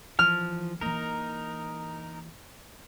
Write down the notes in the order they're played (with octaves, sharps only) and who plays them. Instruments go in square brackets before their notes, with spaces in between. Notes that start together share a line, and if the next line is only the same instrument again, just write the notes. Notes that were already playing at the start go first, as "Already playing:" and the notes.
[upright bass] E3 [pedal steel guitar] F3 [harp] F6
[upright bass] E3 A#3 [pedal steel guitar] D#4 A#4